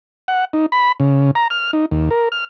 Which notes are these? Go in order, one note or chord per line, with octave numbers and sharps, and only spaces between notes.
F#5
D#4
B5
C#3
A#5
F6
D#4
D#2
A#4
F6